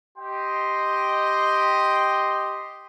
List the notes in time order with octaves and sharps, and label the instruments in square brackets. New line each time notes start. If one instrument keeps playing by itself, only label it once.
[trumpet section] G4 D#5 G5 C6